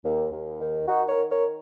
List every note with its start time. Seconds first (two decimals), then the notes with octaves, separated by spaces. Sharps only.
0.04 D#2
0.32 D#2
0.61 D#3
0.88 D#3 D#4 F#4
1.09 A#4 C#5
1.16 D#3
1.31 A#4 C#5